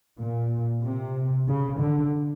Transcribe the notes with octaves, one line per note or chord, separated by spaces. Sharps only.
A#2
C3
C#3
D3